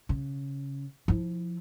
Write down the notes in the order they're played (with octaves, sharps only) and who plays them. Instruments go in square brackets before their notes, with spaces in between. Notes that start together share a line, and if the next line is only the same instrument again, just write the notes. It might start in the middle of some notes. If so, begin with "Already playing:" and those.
[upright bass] C#3
F3 E4